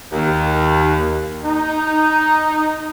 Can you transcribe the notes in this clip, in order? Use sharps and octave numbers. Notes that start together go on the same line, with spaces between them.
D#2
D#4